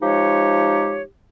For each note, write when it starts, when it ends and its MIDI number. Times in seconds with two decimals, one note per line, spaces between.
0.01 1.03 53
0.01 1.03 56
0.01 1.03 63
0.01 1.03 67
0.01 1.03 73